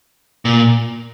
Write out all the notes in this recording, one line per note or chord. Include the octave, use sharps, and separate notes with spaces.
A#2